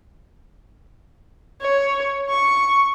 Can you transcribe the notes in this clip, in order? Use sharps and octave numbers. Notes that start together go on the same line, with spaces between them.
C#5
C#6